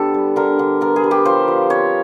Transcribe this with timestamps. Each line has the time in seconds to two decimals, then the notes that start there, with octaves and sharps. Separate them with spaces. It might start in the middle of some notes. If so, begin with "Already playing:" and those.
Already playing: D3 B3 G4 A4
0.14 G3
0.36 D3 A#4
0.59 D3
0.81 B3 A#4
0.96 G#4
1.04 G3
1.11 G4
1.25 F3 C5
1.48 F3
1.70 C4 C#5